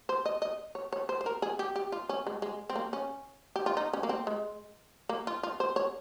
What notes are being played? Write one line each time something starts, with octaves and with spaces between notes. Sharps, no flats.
C5
D#5
D#5
C#5
C#5
C5
C5
A#4
G#4
G4
G4
F4
C#4
G#3
G#3
C4
A#3
C#4
G4
F4
D#4
C#4
A#3
C4
G#3
A#3
F4
F4
C5
C#5